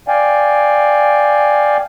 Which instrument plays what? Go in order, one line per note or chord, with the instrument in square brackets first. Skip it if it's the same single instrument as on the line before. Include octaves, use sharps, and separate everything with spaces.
[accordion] D5 F5 G5 G#5